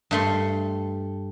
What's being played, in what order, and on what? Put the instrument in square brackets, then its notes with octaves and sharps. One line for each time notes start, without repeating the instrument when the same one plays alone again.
[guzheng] G2 A3 C6